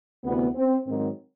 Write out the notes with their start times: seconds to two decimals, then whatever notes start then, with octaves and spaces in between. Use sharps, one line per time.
0.24 D2 C3 E3 B3
0.54 C4
0.85 G#2 D#3 F#3 C4